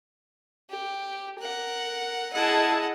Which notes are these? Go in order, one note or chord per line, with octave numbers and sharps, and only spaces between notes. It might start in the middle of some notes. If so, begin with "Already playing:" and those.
G4
A#4 F#5
E4 G#4 D#5 F#5 A5